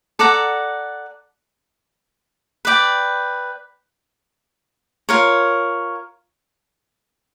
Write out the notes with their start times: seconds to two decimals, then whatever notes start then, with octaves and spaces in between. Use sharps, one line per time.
0.19 A4 D5 F#5 A#5
2.65 B4 D5 G5
5.09 F4 A#4 C#5